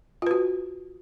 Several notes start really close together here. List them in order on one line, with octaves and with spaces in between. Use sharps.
F4 B4 F#4